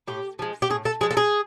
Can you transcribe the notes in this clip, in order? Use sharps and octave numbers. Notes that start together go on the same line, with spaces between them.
A2 G4
F3 G#3
G4
A2 G#4
A4
F3 G#3 G#4
A4
G#4